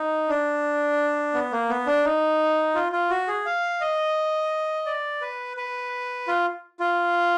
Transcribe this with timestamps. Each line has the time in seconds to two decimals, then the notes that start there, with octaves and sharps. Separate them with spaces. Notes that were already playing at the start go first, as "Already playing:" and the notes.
Already playing: D#4
0.29 D4
1.34 B3
1.52 A#3
1.69 B3
1.87 D4
2.05 D#4
2.75 F4
2.92 F4
3.10 F#4
3.28 G#4
3.46 F5
3.81 D#5
4.86 D5
5.21 B4
5.57 B4
6.28 F4
6.80 F4